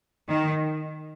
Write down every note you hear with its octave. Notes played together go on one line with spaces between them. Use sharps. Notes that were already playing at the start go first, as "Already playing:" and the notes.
D#3